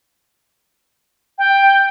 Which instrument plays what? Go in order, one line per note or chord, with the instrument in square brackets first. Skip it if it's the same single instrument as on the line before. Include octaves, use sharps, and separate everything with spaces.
[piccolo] G5